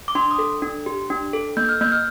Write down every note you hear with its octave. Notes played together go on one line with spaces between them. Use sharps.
D6
D4 C6
D#6
A4
D4
G4
D4
A4
A#3 G6
F6
A#3 G6
F6